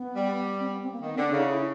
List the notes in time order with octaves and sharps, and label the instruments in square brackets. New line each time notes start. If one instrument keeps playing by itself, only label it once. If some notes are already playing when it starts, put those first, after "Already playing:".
Already playing: [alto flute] B3
[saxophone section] G3
[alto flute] C4
B3
C4
A#3
[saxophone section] D#3 [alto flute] B3
[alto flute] C4
[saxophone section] D3
[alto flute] D4
[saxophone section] C#3 [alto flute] D#4
[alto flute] E4